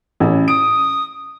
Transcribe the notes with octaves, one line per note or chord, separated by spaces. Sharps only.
A1 C#4
D#6 D7